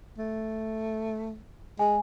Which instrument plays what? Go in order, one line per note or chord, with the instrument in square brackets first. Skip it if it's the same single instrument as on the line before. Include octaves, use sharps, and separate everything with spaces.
[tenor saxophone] A3
[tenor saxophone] G#3 [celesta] G#5